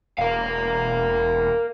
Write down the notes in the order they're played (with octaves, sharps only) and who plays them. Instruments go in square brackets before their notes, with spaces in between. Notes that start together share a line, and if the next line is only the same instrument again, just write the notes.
[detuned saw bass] E1 [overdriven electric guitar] A#4 F5